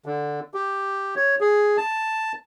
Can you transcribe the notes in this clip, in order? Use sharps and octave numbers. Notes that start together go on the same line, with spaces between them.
D3
G4
C#5
G#4
A5